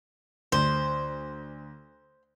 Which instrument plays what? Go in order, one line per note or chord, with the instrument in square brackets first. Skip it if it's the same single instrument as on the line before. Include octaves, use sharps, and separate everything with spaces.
[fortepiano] D2 [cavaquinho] C5